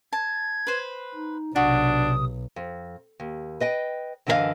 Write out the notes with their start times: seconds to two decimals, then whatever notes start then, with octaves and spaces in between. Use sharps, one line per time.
0.13 A5 G#6
0.67 B4 C5
1.15 D#4
1.56 B1 C3 D4 F#4 D#6
2.56 F2
3.20 D#2
3.60 B4 D#5 G5
4.27 F#2 D3 E3 A#4 D#5 F5